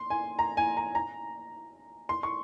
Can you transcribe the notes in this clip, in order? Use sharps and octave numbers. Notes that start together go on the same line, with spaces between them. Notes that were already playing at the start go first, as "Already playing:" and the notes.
Already playing: C6
G#5
A#5
G#5
A#5
A#5
C6
C#6